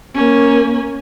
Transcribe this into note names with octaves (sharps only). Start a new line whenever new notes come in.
A#3 C#4